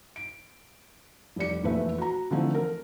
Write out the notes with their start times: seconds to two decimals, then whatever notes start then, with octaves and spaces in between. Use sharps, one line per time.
0.16 D7
1.36 F1 G3 D5 C#7
1.63 F1 E2 A#2 A3 B4 E5
1.98 F#4 A#5
2.31 D3 E3 F3 A3 C4 D#4
2.54 A#4